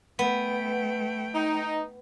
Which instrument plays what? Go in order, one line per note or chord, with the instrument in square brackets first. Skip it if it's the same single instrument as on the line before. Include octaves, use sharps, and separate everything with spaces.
[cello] A3 G5 [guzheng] B3
[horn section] D#4